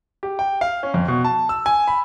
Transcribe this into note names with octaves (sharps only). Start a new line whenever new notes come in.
G4
G5
F5
C#4
F2
B2
A5
E6
G#5
B5